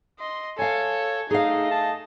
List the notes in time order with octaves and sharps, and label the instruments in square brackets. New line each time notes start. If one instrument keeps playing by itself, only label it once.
[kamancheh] D#5 C6
[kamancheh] A4 [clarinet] C#5 [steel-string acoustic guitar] F5 G#5
[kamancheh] A3 D#5 [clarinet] D#4 [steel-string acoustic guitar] G#4 F5
[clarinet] A5